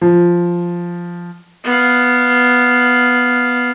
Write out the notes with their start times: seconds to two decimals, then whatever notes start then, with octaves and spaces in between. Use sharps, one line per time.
0.01 F3
1.64 B3 F5